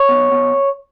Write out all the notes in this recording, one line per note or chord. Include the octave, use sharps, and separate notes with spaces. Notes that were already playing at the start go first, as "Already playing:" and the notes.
Already playing: C#5
B2
B2